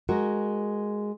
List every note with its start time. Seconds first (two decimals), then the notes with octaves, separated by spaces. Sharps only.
0.09 G#3 F#4 A#4